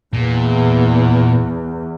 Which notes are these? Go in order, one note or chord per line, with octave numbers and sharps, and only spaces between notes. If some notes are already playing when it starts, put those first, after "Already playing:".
E2 A#2